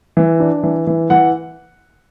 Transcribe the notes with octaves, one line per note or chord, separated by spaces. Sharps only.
E3
D4
E3
E3
E3 F#5